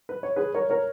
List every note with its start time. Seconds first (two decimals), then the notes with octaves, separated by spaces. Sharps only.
0.09 B4
0.23 C#5
0.36 G#4 B4
0.55 A#4 C#5
0.70 A#4 C#5